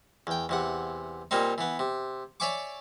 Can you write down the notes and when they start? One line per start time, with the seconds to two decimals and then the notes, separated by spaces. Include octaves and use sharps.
0.27 E2 G5
0.49 E2 C3 F#5
1.31 A#2 G3 A#3 C4 D#4
1.58 E3 B3
1.79 C3
2.40 C#5 D5 E5 G#5 C#6 D6